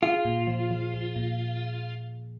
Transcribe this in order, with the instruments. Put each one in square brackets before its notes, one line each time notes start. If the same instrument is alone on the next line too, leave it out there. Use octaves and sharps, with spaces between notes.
[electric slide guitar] F4 [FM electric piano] G#4
[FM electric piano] A#2
F3
F3
F3
A#2